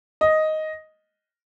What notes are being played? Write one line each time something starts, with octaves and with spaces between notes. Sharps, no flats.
D#5